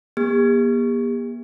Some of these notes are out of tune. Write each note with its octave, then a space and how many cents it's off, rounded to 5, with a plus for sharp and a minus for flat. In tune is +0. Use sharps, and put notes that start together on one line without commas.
A#3 +45 G4 +45